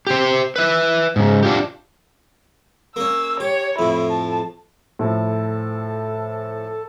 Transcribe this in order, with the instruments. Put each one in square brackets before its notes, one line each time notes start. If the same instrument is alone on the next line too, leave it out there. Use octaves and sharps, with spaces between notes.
[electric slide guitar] G4 C5
B4 E5
G#2 C#3
D4 F4 G4
[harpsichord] A#3 C#4 [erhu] E6
[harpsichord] G4 [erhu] C#5
[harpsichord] F2 A2 [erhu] E4
[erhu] A5
[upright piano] A2 F3 [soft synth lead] A4